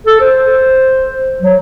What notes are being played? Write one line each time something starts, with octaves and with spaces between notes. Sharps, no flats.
A4
C5
F#3